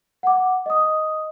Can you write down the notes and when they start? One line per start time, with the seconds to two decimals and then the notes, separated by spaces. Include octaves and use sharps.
0.23 F#5 D6
0.66 D#5 D#6